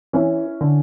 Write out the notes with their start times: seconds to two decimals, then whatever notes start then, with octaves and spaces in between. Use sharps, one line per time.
0.13 E3 C#4 E4
0.61 D3